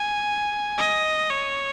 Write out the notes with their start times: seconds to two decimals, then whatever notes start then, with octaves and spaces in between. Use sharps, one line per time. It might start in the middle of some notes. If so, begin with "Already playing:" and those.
Already playing: G#5
0.79 D#5
1.31 C#5